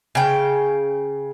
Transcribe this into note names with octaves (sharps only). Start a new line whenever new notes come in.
C#3 G5